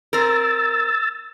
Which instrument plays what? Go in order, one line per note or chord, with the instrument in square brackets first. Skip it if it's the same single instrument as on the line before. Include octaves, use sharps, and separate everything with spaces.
[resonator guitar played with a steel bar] C4 A#4 [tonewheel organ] E6 A6